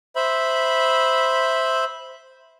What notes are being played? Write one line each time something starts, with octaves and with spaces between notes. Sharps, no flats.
C5 E5 B5